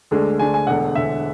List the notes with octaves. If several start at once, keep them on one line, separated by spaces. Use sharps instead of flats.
D2 D3 G#3 D4
D2 D3 G#3 D4 G#5
G#5
E1 E2 D3 F#5
E1 E2 D3 E5